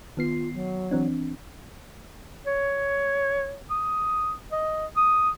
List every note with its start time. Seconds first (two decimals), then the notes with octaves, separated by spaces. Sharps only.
0.17 D#3 B3 F4 C7
0.54 F#3
0.91 E3 C4 D4
2.46 C#5
3.70 D#6
4.52 D#5
4.97 D#6